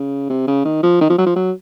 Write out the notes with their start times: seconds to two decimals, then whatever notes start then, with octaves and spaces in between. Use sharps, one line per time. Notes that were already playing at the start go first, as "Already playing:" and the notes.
Already playing: C#3
0.30 C3
0.47 C#3
0.65 D#3
0.83 F3
1.01 D#3
1.10 F3
1.18 F#3
1.26 F3
1.36 F#3